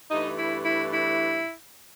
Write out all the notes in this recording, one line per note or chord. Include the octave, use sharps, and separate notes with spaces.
G2 E3 A3 D#4
E4
E4
E4